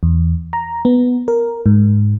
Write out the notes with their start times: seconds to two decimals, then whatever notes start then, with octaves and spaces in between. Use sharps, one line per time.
0.03 E2
0.53 A#5
0.85 B3
1.28 A#4
1.66 G#2